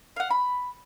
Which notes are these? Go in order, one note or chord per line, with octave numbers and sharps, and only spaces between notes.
F5 F#5
B5